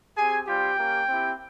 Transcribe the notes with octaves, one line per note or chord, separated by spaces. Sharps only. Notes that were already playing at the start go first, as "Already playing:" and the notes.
C4 G4 G#4 G#5
G3 C4 F4 G4 G5
A#3 C#4 G4
C4 E4 G4